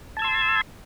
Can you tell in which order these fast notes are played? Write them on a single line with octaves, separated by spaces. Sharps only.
A5 G#6 E6 C6